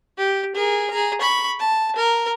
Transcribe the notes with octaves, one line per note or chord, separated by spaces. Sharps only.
G4
G#4 A#4
G#4 A#5
B5 C#6
A5
A#4